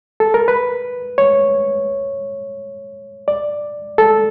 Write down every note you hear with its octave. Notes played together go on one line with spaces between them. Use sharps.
A4
A#4
B4
C#5
D5
A4